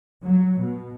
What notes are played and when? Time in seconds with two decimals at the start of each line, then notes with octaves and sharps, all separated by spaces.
0.24 F#3
0.60 B2